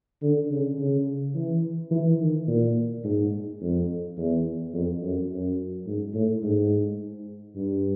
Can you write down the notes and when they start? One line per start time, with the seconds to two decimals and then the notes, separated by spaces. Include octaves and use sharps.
0.22 D3
0.50 C#3
0.78 C#3
1.35 E3
1.91 E3
2.20 D#3
2.47 A#2
3.04 G#2
3.61 F2
4.17 E2
4.73 F2
5.02 F#2
5.30 F#2
5.87 G#2
6.14 A2
6.43 G#2
7.55 G2